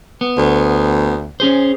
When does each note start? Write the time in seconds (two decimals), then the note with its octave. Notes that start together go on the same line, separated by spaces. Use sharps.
0.21 B3
0.37 D2
1.40 C#4 G#4 C5